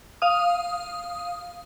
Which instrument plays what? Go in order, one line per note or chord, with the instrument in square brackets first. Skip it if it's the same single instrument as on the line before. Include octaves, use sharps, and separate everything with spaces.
[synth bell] F5 D#6